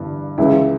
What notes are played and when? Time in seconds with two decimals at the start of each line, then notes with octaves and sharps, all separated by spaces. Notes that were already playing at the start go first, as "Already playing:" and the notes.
Already playing: G1 G2 E3
0.38 C#2 C#3 E3 E4